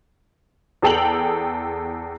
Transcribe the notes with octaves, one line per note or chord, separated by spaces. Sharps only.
E2 G#4 A4 G5 F7 F#7